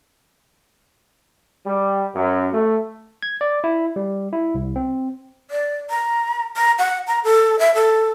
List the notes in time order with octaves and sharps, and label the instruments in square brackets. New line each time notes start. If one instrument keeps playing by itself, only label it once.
[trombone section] G3
F#2
A3
[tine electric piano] G#6
D5
E4
G3
E4
C2
C4
[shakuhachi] D5
A#5
A#5
F#5
A#5
A4
E5
A4